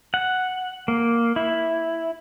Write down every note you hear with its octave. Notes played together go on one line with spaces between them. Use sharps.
F#5
A#3
E4